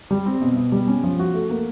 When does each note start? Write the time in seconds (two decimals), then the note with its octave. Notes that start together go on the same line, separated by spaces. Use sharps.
0.11 G3
0.26 C4
0.41 B2
0.57 B2
0.72 G3
0.88 C#4
1.03 F3
1.19 F#4
1.34 A3
1.50 A#3